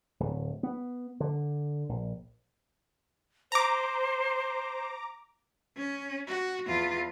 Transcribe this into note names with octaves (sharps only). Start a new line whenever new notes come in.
D1
B3
D3
A#1
C5 A#5 D6
C#4
F#4
E2 F4